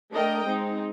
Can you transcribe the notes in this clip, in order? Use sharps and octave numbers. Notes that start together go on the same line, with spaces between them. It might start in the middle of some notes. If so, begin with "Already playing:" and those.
A3 D4 A#4 D#5 G5
G#3 C4 D#4